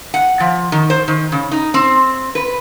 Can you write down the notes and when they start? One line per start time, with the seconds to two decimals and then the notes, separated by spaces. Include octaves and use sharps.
0.14 F#5
0.40 F3
0.72 D#3
0.90 C5
1.08 D#3
1.32 C#3
1.52 D#4
1.74 C4
2.35 B4